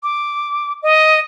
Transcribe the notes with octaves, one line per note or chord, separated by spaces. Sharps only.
D6
D#5